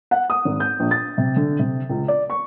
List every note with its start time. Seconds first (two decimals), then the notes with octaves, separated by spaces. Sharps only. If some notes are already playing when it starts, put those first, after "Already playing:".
0.11 F#5
0.30 D#6
0.45 G#1
0.60 G6
0.80 A#1
0.91 A6
1.18 C3
1.36 D3
1.59 C3
1.89 C#2
2.08 D5
2.30 C#6